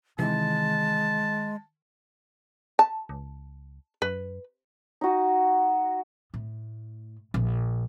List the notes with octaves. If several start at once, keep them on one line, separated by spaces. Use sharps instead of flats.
C3 D#3 E3 G#3 A5
A5
C#2
F#2 B4
D#4 F#4
A2
A#1